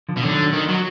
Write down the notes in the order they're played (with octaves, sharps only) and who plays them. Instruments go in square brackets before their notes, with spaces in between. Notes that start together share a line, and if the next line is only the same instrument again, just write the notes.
[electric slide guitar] D3 F3
[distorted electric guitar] B2
[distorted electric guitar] D3 [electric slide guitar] D#3 F#3
[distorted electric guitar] D#3
F#3